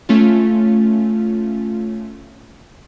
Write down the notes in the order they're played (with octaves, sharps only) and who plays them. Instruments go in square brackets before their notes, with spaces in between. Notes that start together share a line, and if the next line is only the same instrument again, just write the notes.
[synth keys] A3 C#4 F4